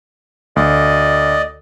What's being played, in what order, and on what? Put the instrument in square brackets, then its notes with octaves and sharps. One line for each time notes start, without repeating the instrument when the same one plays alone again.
[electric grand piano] D2 [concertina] D5 D#5